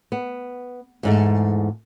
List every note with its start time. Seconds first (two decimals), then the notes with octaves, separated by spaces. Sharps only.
0.12 B3
1.03 E2 G#2 A3